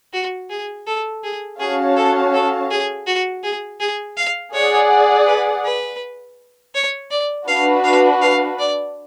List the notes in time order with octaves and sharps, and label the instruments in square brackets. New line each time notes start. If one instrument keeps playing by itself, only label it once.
[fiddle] F#4
G#4
A4
G#4
[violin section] C#4 F#4 C#5 F5 A5 [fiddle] G#4
[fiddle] A4
A4
G#4
F#4
G#4
G#4
F5
[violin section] G#4 D5 F#5 [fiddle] C#5
[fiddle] B4
B4
C#5
D5
[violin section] D4 F#4 B4 [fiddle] F5
[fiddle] F5
F5
D5